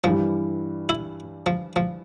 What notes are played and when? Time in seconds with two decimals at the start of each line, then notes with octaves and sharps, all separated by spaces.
0.04 G2 E3 F3 G3
0.89 E4
1.46 F3
1.76 F3